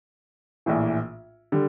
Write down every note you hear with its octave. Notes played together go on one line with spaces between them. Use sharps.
A#1 A2 E3
D3 G3